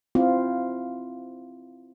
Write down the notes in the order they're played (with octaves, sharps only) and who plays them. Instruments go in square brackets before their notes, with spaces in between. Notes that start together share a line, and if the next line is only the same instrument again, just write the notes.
[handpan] C4 E4 F4